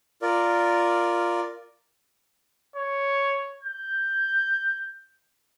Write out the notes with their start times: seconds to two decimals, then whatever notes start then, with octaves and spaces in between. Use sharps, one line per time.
0.22 F4 A#4 D5
2.76 C#5
3.63 G6